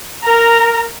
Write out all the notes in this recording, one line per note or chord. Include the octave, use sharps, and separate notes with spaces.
A#4 A#5